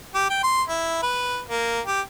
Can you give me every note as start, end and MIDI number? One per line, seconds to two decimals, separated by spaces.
0.15 0.25 67
0.30 0.43 79
0.43 0.62 84
0.69 1.03 64
1.03 1.40 71
1.50 1.80 58
1.87 2.01 67